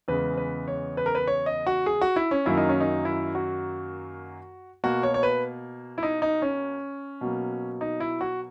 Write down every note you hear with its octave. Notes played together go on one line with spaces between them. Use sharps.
E2 C#3 G#3 B4
B4
C#5
B4
A#4
B4
C#5
D#5
F#4
G#4
F#4
E4
C#4
F#2 D#3 F#3 A#3 E4
D#4
C#4
D#4
E4
F#4
B2 A#3 F#4
C#5
C#5
B4
E4
D#4
D#4
C#4
B2 F#3 A#3
D#4
E4
F#4